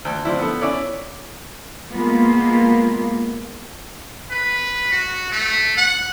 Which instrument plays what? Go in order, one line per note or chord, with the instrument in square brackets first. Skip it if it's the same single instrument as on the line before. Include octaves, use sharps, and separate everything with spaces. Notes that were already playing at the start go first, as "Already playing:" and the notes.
[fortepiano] D2
F3 C4 D4 E4
B3 A4
C#4 E4 C#5 D5
[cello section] G#3 A#3 B3 F4
[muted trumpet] B4
F#4
A3
F#5